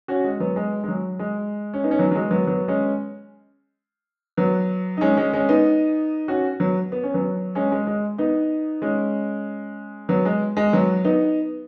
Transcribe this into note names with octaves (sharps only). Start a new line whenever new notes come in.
C#4 F#4
G#3
F#3 B3
G#3
G#3
F#3
G#3
C#4
B3 D#4
C#4
F#3 B3
F#3
G#3
F#3 B3
F#3 B3
G#3 C#4
F#3 B3
D#4
G#3 C#4
G#3 C#4
G#3 C#4
B3 D#4
C#4 F#4
F#3 B3
B3
C#4
F#3 B3
G#3 C#4
G#3
G#3
B3 D#4
G#3 C#4
F#3 B3
G#3
G#3
F#3 B3
B3 D#4